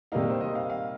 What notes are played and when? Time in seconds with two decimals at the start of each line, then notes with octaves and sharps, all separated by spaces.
0.12 C3 D#3 G3 A#3 D#4 F5
0.30 C5
0.41 D#5
0.55 F5
0.70 F5